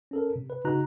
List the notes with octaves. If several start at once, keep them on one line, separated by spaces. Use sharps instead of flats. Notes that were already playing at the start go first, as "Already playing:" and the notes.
C#4 A4 A#4
C3
B4
C#3 D#4 F#4 A#5 F#6